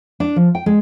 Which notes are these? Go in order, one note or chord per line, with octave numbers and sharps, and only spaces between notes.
D4
F3
G5
G#3